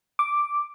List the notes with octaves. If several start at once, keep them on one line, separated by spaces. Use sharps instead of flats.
D6